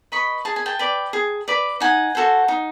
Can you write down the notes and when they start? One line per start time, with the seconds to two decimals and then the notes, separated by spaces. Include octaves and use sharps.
0.12 B4 D#5 B5 C#6
0.45 G#4 A5
0.56 G#5
0.66 G5 A5
0.79 B4 D5
1.13 G#4
1.48 B4 D5
1.80 D#4 F#5 G#5
2.15 F#4 A4 C5
2.48 D#4